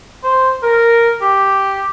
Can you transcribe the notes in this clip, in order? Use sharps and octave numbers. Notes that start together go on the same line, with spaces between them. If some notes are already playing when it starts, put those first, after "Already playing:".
C5
A#4
G4